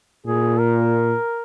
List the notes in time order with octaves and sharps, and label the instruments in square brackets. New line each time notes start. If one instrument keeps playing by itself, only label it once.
[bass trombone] A#2 [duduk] G#4
[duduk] A#4